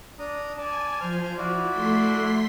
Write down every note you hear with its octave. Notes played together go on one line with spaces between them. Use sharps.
D4 A#5 D#6
D5 G#5 A5
F3 C5 F6
E4 F#4 D5
A3 C6 B6